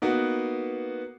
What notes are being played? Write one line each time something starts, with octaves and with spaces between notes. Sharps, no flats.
A#3 B3 D#4 F#4